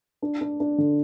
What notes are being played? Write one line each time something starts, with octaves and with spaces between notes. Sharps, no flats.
D4
D4
D4
D3